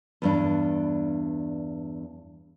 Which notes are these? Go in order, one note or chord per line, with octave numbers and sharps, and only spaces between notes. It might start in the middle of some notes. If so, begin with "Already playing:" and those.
E2 G2 D4